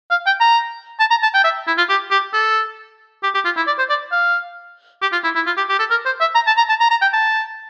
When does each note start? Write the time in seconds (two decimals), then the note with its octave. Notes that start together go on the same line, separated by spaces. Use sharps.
0.11 F5
0.26 G5
0.40 A#5
1.00 A5
1.11 A#5
1.23 A5
1.34 G5
1.44 E5
1.67 E4
1.78 F4
1.89 G4
2.11 G4
2.33 A4
3.23 G4
3.34 G4
3.45 F4
3.56 E4
3.67 D5
3.79 C5
3.90 D5
4.12 F5
5.02 G4
5.12 F4
5.24 E4
5.35 E4
5.46 F4
5.57 G4
5.69 G4
5.79 A4
5.90 A#4
6.06 C5
6.20 E5
6.35 A#5
6.47 A5
6.57 A#5
6.69 A5
6.80 A#5
6.91 A#5
7.02 G5
7.13 A5